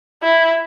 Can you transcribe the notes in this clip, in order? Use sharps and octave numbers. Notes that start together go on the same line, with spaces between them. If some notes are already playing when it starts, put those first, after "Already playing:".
E4